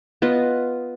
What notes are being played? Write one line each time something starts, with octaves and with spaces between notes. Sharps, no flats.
B3 F4 D#5